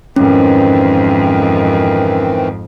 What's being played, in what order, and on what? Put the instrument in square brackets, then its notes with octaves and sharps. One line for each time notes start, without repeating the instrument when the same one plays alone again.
[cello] F2 G#2 [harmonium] D#3 E3 C4 [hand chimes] C#4